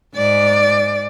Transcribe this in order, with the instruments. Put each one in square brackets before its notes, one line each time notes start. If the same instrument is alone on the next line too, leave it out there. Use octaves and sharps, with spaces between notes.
[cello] G#2 D5